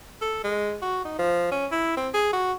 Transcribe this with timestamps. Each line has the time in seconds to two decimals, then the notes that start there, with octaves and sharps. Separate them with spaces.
0.22 A4
0.44 G#3
0.82 F#4
1.05 D#4
1.19 F3
1.51 C#4
1.71 E4
1.97 C4
2.14 G#4
2.33 F#4